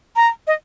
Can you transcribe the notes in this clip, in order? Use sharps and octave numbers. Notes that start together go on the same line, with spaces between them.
A#5
D#5